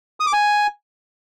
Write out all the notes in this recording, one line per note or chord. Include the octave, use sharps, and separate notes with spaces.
D#6
D6
G#5